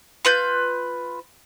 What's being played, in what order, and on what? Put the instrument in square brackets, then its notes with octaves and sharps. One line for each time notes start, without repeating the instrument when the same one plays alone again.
[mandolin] F4 B4 G6